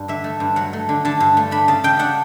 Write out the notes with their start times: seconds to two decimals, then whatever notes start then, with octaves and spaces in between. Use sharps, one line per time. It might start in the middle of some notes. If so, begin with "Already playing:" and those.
Already playing: G2 D5
0.08 D3 E5
0.24 A3
0.40 G2
0.56 F#3 F#5
0.73 A3
0.89 D3
1.05 D3 A5
1.20 G2
1.37 A3
1.51 D4 B5
1.68 C#3 A5
1.84 C#3 G5
1.99 D4 F#5